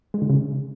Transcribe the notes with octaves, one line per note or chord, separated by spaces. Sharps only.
G#3
D3
C#3